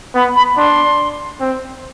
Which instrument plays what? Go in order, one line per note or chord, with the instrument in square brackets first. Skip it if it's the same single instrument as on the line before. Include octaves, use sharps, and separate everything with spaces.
[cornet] B3 [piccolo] B5
[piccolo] B5
[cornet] D4 [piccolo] C6
[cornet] C4